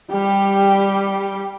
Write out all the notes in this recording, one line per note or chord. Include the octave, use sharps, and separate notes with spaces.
G3 G4